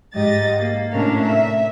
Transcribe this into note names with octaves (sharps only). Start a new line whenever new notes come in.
G#2 G4 D#5 A6
A#3
A2 C3 C#4 D4 A#4 F5
E5